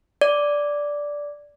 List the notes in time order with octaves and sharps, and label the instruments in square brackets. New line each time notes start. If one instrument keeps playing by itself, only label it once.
[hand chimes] D5